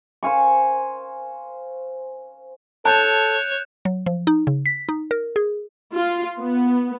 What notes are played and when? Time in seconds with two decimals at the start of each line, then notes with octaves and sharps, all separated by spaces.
0.23 C5 F5 G#5 C#6
2.85 A4 C#5 A5 F#6 G6 E7
3.85 F#3
4.06 F3
4.27 D#4
4.47 C#3
4.66 B6
4.89 D#4
5.11 A#4
5.36 G#4
5.95 F4
6.39 B3